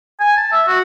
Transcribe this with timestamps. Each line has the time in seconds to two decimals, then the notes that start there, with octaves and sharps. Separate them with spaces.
0.20 G#5
0.37 A5
0.52 E5
0.68 F#4